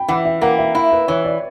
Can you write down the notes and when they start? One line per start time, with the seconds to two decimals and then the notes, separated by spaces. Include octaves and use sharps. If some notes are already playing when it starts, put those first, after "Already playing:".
Already playing: G5 B5
0.08 E3 F#5
0.25 E5
0.42 A#3 F#5
0.58 E5
0.75 E4 E5
0.91 B4
1.08 E3 C#5
1.24 D5